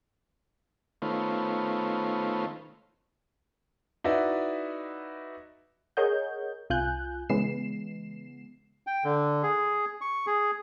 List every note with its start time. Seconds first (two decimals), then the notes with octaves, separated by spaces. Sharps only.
1.02 D#3 A3 B3 C#4 F4 C5
4.04 D#4 E4 F#4 B4 D5 D#5
5.97 G#4 A#4 C#5 D#5 F#5 G6
6.70 C2 F4 G#5 F#6 G6
7.29 C#3 E3 G#3 B3 C7 E7
8.87 G5
9.04 D3
9.43 G#4
10.01 C#6
10.27 G#4